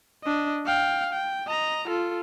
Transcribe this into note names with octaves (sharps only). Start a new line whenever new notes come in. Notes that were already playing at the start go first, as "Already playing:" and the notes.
D4 D#5
F5 G5
G5
D#5 A#5
F4 A4